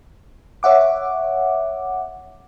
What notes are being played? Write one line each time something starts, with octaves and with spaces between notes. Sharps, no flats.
C#5 E5 F#5 D6